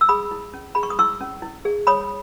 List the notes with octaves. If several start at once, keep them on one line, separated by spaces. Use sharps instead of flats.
E6
G#4 B5 D#6
E4
C#4
G#4 B5
C#6
D#6
E4 C#6 E6
C#4
E4
G#4
C#5 B5 D#6